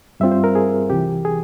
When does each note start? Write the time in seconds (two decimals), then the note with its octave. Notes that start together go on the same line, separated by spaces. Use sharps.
0.20 G2 G3 C4 F4 E5
0.31 C5
0.44 A#4
0.55 G#4
0.90 C2 C3 E3 G4
1.25 G#4